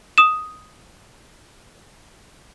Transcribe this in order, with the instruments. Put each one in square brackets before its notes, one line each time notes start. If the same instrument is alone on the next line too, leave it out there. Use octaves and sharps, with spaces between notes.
[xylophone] D#6 E7